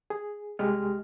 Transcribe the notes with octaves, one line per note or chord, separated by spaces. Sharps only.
G#4
C2 G#3 G4 F6